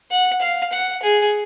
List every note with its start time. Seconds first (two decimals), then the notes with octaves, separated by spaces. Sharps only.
0.11 F#5
0.41 F5
0.72 F#5
1.03 G#4